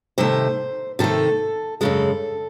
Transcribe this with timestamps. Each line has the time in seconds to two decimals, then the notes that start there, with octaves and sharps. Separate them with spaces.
0.18 C3 D#3 A3 C5
0.99 C3 D#3 A3 A4
1.81 F#2 C#3 G#3 A4